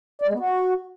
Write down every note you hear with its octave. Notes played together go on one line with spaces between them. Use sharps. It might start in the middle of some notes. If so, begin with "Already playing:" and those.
D5
G#3
B3
F#4